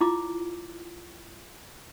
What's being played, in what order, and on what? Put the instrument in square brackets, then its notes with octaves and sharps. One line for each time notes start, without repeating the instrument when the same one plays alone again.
[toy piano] E4 F4 D6